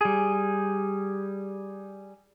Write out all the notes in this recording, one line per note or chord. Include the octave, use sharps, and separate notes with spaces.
G3 G#4